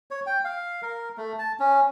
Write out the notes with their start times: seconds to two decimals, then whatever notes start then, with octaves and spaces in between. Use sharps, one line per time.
0.11 C#5
0.26 G5
0.45 F5
0.82 A#4
1.17 A3
1.39 A5
1.60 C#4